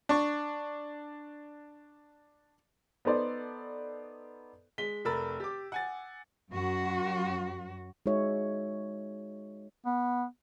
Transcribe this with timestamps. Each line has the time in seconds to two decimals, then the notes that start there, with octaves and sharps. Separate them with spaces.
0.09 D4 C#6
3.05 B3 D#4 A4 C5 D5
4.78 G#3 B6 G7
5.05 F1 A3 A#4 B5 E6 A6
5.40 G4 D6
5.72 F#5 G#5 A6
6.51 F#2 F#4
8.06 G#3 D#4 F#4 C#5 E5
9.86 B3